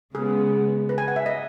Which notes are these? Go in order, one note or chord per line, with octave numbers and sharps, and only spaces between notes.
C#3 G#3 B3 G#4
B4
G#5
F#5
E5
D#5